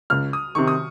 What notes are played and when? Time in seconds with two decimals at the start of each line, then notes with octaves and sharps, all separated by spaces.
0.10 C#2 F6
0.33 D#6
0.55 C3 D#3 C#6
0.68 D#6